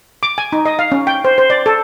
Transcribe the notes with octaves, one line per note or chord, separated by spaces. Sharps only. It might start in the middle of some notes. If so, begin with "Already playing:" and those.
D6
G#5
D#4
D#5
F5
C#4
G5
C5
C5
D5
A4